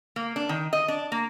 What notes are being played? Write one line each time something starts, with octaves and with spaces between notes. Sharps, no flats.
A#3
D4
D#3
D#5
D4
A#3